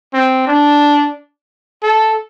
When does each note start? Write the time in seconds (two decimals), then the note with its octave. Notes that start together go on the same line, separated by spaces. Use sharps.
0.14 C4
0.47 D4
1.83 A4